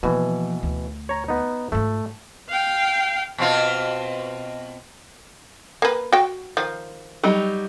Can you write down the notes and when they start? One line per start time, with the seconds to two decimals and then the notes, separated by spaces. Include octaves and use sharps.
0.03 B2 E3 F3 A#3
0.63 D2
1.09 C#5 A#5
1.28 B3 D#4
1.72 G#2 A3 F4
2.49 F5 G5
3.38 B2 C4 F4
5.82 A#3 B4
6.12 F#4 G5
6.57 D#3 F3
7.23 F#3 G3 D#4